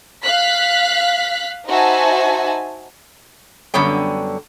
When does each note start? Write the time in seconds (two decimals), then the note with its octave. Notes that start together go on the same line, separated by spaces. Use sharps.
0.22 F5 F#6 B6
1.67 D#4 F#4 C5 E5 G#5 A5
3.74 F#2 D3 G3 B3 C#5 G5